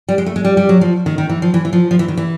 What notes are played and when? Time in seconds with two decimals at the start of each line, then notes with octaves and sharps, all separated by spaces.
0.09 G3
0.18 G#3
0.26 A3
0.36 G#3
0.45 G3
0.57 G3
0.69 F#3
0.81 F3
1.06 D#3
1.18 D#3
1.30 E3
1.42 F3
1.54 E3
1.65 E3
1.73 F3
1.91 F3
1.99 E3
2.08 D#3
2.17 E3